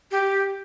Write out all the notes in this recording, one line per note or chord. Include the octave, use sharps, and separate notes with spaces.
G4